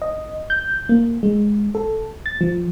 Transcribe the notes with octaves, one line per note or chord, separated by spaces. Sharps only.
D#5
G6
A#3
G#3
A4
A6
F3